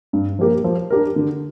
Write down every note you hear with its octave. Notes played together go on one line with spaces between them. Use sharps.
G2
F3 A#3 G4 A#4
F3
D4 G4 A#4
D3